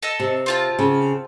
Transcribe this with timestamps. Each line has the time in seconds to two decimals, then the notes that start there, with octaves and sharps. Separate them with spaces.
0.03 A4 D#5 E6
0.20 C3
0.46 C4 F4 A5
0.79 C#3